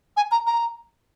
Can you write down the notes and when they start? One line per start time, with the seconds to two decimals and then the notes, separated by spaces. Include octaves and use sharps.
0.17 G#5
0.31 A#5
0.47 A#5